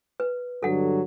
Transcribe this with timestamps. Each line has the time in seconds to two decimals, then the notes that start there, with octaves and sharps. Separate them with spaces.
0.20 B4
0.63 G2 D3 F#3 A4 F#5